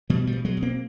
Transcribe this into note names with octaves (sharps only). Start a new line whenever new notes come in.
B2 F3 G3
F3 G3
B2
F#3 G#3
B2
A#3 C4